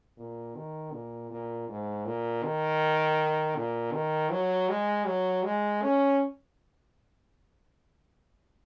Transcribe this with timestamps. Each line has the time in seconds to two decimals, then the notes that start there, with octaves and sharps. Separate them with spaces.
0.18 A#2
0.56 D#3
0.92 A#2
1.30 A#2
1.68 G#2
2.05 A#2
2.43 D#3
3.55 A#2
3.93 D#3
4.31 F#3
4.69 G#3
5.06 F#3
5.43 G#3
5.82 C#4